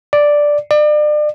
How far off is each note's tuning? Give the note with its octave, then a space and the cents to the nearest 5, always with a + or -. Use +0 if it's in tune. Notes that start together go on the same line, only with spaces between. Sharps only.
D5 +0
D5 +35